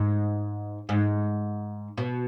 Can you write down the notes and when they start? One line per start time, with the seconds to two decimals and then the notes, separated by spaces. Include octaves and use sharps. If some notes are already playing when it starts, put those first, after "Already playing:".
Already playing: G#2
0.89 G#2
1.98 B2